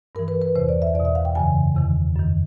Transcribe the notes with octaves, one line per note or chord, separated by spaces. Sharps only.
G2 E3 A#4
B4
B4
E2 C3 E3 C5
D5
E5
E2 D5
B2
E5
F5
G5
F#2 C#3 E3 G#5
E2 C3 D#3
F#2 D#3